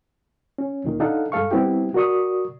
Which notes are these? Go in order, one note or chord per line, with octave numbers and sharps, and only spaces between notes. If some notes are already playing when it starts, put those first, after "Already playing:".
C#4
D2 A#2 D#3
D4 D#4 A4 F5 F#5
G2 G#3 A4 F5 C#6
G3 B3 C4 E4 G4
F#4 A#4 D5 C#6 D#6